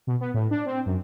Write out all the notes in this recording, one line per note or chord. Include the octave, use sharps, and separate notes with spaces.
B2
B3
A2
D4
C4
F#2